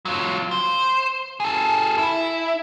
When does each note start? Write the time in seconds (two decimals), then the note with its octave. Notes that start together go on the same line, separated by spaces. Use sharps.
0.05 F#3 F4
0.51 C5
1.40 G#4 A4
1.98 E4